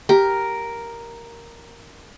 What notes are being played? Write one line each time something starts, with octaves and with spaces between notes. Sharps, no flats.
G4 A#4